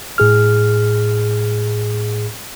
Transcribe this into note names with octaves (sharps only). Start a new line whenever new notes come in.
A2 G#4 F6